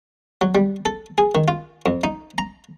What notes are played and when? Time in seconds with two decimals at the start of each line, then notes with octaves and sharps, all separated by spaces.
0.41 F#3
0.55 G3
0.86 A4
1.18 G#4
1.35 D#3
1.48 F4
1.86 F2
2.04 D#4
2.38 A#5